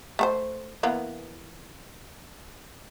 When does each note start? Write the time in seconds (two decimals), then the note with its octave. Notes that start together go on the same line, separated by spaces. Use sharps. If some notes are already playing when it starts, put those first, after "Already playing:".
0.19 A3 A4 C5
0.83 E3 A#3 B3